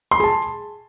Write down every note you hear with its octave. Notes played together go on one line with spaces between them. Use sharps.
G#4 A5 B5 C6